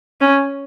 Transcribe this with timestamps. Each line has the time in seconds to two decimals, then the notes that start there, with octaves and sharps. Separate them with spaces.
0.21 C#4